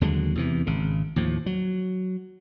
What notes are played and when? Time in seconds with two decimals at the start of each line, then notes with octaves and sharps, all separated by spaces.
0.01 D#2 D3 F#3 G#3
0.35 E2 C3 E3
0.67 G#1 C#3
1.16 D#2 A2 F3
1.46 F#3